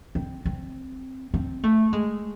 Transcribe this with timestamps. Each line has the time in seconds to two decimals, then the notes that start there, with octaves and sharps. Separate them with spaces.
0.15 C4
0.45 C4
1.34 C4
1.63 A3
1.93 G#3